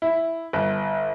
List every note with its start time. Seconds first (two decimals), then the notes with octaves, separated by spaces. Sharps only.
0.02 E4
0.53 G1